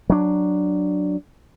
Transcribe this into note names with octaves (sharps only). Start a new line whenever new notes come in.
F#3 D4